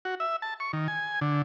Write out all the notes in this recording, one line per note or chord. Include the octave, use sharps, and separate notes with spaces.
F#4
E5
A5
C#6
D#3
G#5
D3